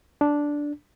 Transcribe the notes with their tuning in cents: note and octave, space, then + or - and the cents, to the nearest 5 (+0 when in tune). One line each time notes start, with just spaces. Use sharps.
D4 -5